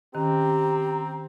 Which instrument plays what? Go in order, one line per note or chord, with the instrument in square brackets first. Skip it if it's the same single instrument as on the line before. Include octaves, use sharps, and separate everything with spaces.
[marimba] D#3 C#4 [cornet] C4 [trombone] G4 [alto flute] A#5